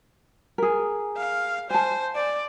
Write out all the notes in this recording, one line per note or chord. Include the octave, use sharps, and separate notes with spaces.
G#4 A#4
F5
C5 G#5 A5
D5